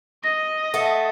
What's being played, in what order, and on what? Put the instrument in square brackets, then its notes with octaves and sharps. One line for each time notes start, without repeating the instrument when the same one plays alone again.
[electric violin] D#5 [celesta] A#6
[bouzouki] A3 [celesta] F#5